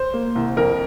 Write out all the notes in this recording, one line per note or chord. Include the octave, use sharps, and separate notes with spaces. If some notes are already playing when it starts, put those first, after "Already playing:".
Already playing: C5
A#3
C2
F2 A#4